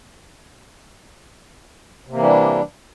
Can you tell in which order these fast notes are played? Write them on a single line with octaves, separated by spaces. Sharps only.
C3 A#3 E3 G3 D4